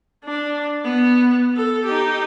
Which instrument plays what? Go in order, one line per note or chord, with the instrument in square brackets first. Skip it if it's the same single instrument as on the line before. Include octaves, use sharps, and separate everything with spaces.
[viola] D4
B3
A4
D#4 G4